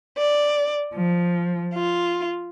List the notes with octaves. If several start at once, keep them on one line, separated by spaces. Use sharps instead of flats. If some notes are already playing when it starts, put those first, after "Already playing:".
D5
F3
F4